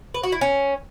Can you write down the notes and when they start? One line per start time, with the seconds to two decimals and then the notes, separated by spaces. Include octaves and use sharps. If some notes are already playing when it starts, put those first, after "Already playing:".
0.14 B4
0.23 F#4
0.32 E4
0.41 C#4